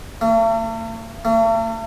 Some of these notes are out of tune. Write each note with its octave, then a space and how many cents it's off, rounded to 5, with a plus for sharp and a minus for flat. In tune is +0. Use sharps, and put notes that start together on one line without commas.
A3 +45
A3 +45